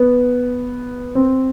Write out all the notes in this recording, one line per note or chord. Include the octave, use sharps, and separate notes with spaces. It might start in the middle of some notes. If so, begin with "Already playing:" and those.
Already playing: B3
C4